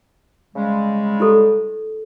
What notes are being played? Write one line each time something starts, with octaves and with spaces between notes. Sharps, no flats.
C#3 G3 G#3
E4 G4 A4